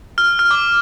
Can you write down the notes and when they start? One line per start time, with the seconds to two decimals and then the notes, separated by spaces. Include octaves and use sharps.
0.18 F6
0.39 F6
0.51 D6